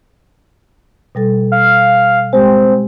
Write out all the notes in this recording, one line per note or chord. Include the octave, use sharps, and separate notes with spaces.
B2 G3 A4
F5
G#3 C4 G4